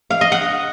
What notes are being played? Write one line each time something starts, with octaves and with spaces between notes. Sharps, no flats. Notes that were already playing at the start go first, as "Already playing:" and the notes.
F5
D#5
F#5